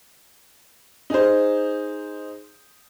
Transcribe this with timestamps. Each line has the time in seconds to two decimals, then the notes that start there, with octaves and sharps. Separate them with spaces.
1.10 D#4 G#4 C5